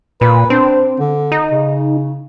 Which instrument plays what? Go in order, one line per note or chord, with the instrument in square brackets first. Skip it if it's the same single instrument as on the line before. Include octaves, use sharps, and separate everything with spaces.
[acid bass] A#2 [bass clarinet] B4
[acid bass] C4 [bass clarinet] D4
[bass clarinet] D3
[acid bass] D#4
[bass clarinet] C#3